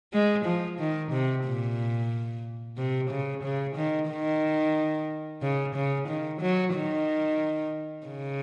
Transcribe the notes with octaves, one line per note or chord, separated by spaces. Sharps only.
G#3
F3
D#3
C3
A#2
C3
C#3
C#3
D#3
D#3
C#3
C#3
D#3
F#3
D#3
C#3